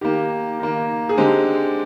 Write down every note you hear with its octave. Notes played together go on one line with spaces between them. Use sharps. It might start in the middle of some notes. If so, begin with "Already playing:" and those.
D#3 A#3 G4
D#3 A#3
G#4
D3 G#3 C4 G4